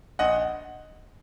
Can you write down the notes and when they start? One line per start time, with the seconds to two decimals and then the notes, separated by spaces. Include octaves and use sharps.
0.19 A#1 D#5 F#5